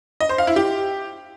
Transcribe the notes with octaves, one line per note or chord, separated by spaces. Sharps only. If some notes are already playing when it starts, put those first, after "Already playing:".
D#5
C5
F5
E4
G4